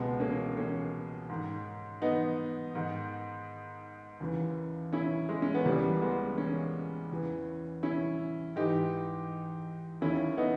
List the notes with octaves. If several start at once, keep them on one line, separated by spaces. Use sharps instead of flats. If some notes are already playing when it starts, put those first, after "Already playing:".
Already playing: C#2 B2 G#3 B3
A#3 C#4
A#3 C#4
G#2 D#3
B3 D#4
G#2 D#3
D#2 C#3 E3
C#4 E4
G#3
C#4
B3
C#2 C#3 E3 G3 A#3
G#3 B3
A#3 C#4
E2 C#3 E3
C#4 E4
G#2 E3 D#4 G4
D#2 D#3 C#4 E4
B3 D#4